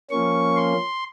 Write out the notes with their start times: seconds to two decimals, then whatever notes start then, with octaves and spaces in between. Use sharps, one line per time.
0.10 F3 A#3 C#4 C#6
0.56 C6